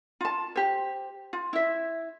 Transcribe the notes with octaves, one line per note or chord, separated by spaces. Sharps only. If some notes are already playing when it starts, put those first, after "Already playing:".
F4 A5
G4 C5
F4
E4 E5